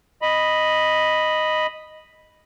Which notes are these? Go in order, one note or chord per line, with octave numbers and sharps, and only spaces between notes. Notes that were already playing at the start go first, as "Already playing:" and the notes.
D#5 B5